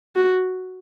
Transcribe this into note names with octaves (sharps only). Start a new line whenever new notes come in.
F#4